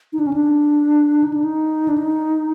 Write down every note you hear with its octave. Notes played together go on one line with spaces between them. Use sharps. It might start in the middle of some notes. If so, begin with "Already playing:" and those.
D#4
D4
C#4
D4
D#4
D4
D#4
D4
D#4